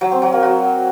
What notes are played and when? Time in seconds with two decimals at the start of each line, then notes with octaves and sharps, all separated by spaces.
0.01 F#3
0.12 C4
0.22 F#3
0.32 A#3
0.43 F#4